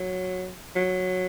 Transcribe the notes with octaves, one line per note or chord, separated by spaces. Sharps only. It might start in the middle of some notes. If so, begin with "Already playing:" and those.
Already playing: F#3
F#3